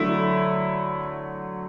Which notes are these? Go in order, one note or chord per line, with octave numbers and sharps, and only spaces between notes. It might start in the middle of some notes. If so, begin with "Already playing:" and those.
Already playing: D3 F#3 A3 E4